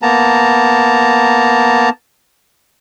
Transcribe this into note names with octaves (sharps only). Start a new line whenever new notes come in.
A#3 B3 A5 A#5